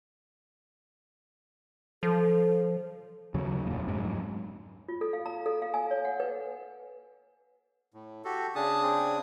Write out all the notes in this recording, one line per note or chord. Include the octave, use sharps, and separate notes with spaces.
F3 A4
D#2 C#3 F#3
F1 A#2
F2 G#2 F#3
F4
A4
F5
A#5
A4
F5
G#5
C#5
F#5
B4
A2
F#4 G4 A4
C#3 D4 G#4 A5 D#6
C4 G#4